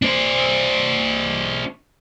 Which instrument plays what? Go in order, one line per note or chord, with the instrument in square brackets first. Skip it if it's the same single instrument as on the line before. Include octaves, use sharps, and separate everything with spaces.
[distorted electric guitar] D4 C5